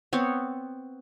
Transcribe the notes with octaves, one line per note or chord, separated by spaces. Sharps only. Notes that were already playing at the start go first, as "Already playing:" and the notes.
B3 C4 C#5